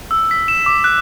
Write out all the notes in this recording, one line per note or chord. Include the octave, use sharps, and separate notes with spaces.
E6
B6
E7
D6
F#6